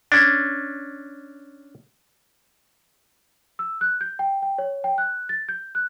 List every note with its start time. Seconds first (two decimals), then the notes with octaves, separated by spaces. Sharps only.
0.12 C#4 D4
3.59 E6
3.81 F#6
4.01 G6
4.19 G5
4.42 G5
4.58 C#5
4.84 G5
4.98 F#6
5.29 A6
5.49 G6
5.75 F#6